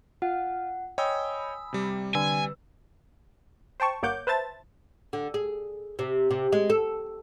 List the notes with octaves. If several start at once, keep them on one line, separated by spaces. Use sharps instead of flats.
F4 F#5
C#5 D#5 G5 G#5 B5 D#6 E6
C3 G3
D3 B4 G#5 E6
C5 G5 A5 C#6
G1 A#3 C#5 F#5 D6 G6
B4 C5 E5 A5 A6
D3
G#4
C3
C3
G#3
A4